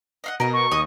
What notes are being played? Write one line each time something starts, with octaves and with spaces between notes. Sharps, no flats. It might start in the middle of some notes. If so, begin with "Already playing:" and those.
D#5 F5 F#5
B2 A#4 D#5
C#6
D#2 D#5 D#6